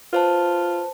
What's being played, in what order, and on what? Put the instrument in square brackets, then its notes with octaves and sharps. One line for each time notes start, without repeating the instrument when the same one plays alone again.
[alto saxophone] F4 [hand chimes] B4 C5 A5